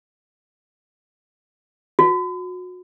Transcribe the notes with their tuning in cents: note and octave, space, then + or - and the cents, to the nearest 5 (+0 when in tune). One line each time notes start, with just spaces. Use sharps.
F#4 -30